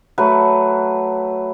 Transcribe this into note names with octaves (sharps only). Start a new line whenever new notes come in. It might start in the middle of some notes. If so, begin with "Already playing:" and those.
F#3 A3 B4